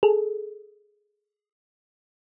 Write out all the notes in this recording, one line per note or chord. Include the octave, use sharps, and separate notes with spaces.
G#4 A4